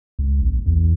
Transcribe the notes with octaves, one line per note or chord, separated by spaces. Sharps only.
C#2
A#1
E2